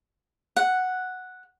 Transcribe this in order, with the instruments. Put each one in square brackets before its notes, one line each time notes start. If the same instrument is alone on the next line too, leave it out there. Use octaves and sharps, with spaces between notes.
[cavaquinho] F#5